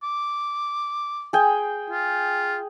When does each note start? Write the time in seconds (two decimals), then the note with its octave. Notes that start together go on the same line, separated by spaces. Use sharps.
0.03 D6
1.33 G#4 G5
1.90 F4